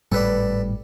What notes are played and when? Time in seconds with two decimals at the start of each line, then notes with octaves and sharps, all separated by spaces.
0.12 G#1 A2 G3 A4 B4 D5